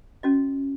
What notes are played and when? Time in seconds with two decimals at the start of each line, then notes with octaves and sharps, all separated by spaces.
0.23 C#4 F#4 D#5